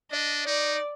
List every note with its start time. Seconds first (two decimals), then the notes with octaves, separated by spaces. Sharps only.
0.12 D4 D#5
0.46 D#4 D5